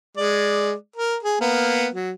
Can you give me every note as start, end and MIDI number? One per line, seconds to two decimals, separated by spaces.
0.17 0.73 56
0.17 0.73 74
0.96 1.17 70
1.23 1.38 68
1.41 1.88 58
1.41 1.88 59
1.94 2.11 54